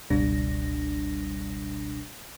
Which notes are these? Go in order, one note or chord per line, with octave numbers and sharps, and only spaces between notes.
G1 C#2 B2 G3 D4 A#6